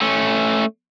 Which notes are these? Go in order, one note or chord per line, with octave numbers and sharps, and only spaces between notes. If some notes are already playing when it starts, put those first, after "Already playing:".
A3 C#4